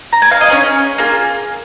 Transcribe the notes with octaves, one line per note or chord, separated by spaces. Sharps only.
A#5
G#5
F5
D#5
C#4 G#4 C#5
A#3 F4 G#4